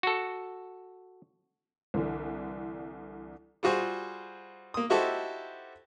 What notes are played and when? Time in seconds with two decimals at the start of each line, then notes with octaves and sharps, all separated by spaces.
0.03 F#4 A4
1.94 C2 D3 E3
3.63 G3 F4 F#4 G#4 C5
4.74 A#3 D#6
4.90 D#4 E4 F#4 G4 A4 C5